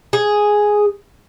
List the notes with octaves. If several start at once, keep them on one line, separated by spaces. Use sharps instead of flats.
G#4